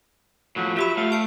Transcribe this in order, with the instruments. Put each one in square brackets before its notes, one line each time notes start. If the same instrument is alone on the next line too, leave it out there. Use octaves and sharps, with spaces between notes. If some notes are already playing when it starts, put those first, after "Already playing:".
[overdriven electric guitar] A2 F3 [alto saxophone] F#3
[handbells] F4 G4 B5 [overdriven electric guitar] E5
[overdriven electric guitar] A3 [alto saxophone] F5
[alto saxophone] F5 [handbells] A5 D7